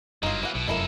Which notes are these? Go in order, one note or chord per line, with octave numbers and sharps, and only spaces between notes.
F#1 G2 F#3 A#3 D#4 F4
E3 F#5
B1 B2
F1 F#2 G#3 A#3 E4 A4 A#4